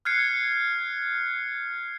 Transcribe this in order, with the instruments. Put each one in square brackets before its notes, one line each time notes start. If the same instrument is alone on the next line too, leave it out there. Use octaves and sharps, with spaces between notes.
[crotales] F6 F#6 G#6 C7 C#7